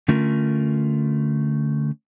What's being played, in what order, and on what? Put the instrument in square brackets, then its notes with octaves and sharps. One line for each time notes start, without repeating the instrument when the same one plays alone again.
[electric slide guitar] D3 A3 C#4 F4 A#4